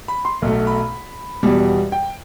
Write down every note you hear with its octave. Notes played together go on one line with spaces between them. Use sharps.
B5
C6
B1 B2 A3
B5
E2 B2 G3
G5